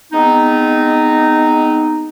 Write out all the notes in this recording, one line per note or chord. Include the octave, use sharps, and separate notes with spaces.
G#3 B3 C4 D#4